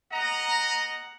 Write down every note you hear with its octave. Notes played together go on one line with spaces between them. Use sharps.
D#5 F#5 A#5